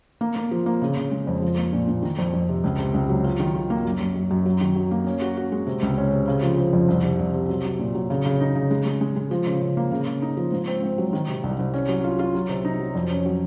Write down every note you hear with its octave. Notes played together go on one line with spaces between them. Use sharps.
A#3
A#3
F3
A#3
C#3
C#3
G#3
F2
F3
A#3
A#2
A#2
D#3
F2
F2
C3
C#2
C3
C#2
F#3
F4
D#3
F4
A#3
F#2
F#2
F#2
F#2
F#3
D#3
F#3
A#3
C#4
F#4
F#4
G#3
C3
C#2
C#4
C3
C#3
F3
F3
F2
C2
C3
C2
C3
F#3
F#3
A#2
F#3
C#3
C#3
D#4
C#3
G#3
G#3
G#3
G#3
F3
C#3
C#3
A#3
C#3
C#3
D#4
F3
G#2
C4
G#2
F#3
D#3
C3
C2
C2
C#4
F#3
F4
F4
F#3
C3
D#4
F#3
F2
C#4
F#3